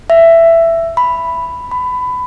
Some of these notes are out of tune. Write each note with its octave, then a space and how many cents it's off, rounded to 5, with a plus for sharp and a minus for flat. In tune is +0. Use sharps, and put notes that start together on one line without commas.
E5 +10
B5 +5
B5 +20